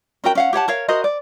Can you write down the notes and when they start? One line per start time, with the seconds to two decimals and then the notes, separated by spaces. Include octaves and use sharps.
0.24 C#4 F#4 A#4 G5
0.35 C#4 F5 F#5
0.53 G4 C#5 F#5 A5
0.68 A#4 C#5 F5
0.88 F#4 A#4 C5 D#5
1.04 D5